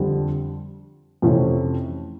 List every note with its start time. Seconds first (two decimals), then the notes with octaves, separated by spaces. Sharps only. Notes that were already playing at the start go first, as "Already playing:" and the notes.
Already playing: F2 D3 G3
1.22 F2 C3 E3 A3 C#4